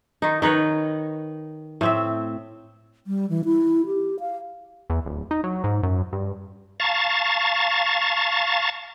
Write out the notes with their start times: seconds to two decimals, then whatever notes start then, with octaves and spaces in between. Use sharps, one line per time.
0.22 D#3 D#4
0.42 D#3 D#4 B4 C#5
1.81 A2 C4 E5
3.07 G3
3.29 E3
3.45 E4
3.86 G4
4.20 F5
4.90 E2
5.05 D1
5.31 D#4
5.44 F#3
5.64 G#2
5.83 F#2
6.13 G2
6.80 F5 A5 A#5 C#6 A6